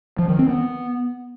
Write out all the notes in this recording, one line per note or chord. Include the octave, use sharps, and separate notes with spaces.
F3
D#3
C4
B3